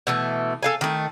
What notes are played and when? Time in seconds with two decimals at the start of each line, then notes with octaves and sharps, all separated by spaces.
0.07 B2 E3 A3
0.63 A4 F5 G#5
0.81 D#3 A3